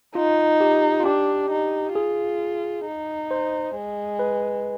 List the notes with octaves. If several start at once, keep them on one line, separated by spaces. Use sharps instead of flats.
D#4 F4
G4
F4
D4 G4
D#4
F4 G#4
D#4
C5
G#3
B4